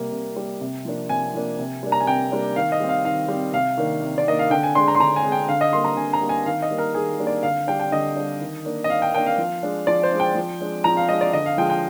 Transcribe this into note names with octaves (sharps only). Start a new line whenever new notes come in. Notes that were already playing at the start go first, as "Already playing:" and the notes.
Already playing: C3 G3 A#3
C3
G3 A#3
C3
F3 A#3 D4
C3 G#5
F3 A#3 D4
C3
G3 A#3 D4
A#5
G#5
C3 G5
G3 A#3 D4
D#3 F5
D#5
G3 C4
F5
D#3 F5
G3 C4
C3 F5
D#3 A#3 D4
C3
D5
D#3 A#3 D4 D#5
F5
D3 G5
G#5
G#3 D4 C6
A#5
C6
D3 A#5
G#5
G#3 D4
G5
D3 F5
D#5
G3 A#3 C6
A#5
D3 G#5
A#5
G3 A#3
G#5
D#3 F5
D#5
G3 A#3 D4
A#4
D#3 G#4
G3 A#3 D4
D5
D3 F5
G3 D4 G5
G5
D3 D#5
G3 D4
D#3
A#3 D4
D#5
D#3 F5
G5
A#3 D4 G5
F5
F3
G#3 D4
F3 D5
C5
G#3 D4
G5
F3
G#3 D4
F3 A#5
F5
G#3 D4 D#5
D5
D3 D#5
F5
F3 G#3 G5
G5